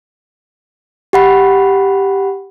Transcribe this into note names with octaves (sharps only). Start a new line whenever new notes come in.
G4 F#5 B5